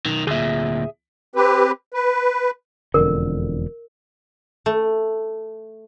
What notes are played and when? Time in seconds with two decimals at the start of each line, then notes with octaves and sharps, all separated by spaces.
0.06 B1 D#3
0.27 D2 A#2 G#4 E5
1.36 C4 G4 B4
1.94 B4
2.94 E1 F2 D3 A#4
4.66 A3